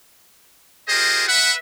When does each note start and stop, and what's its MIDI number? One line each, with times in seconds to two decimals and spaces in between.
0.88 1.26 65
0.88 1.26 67
0.88 1.26 68
0.88 1.26 70
0.88 1.26 72
0.88 1.26 75
1.28 1.53 71
1.28 1.53 76
1.28 1.53 78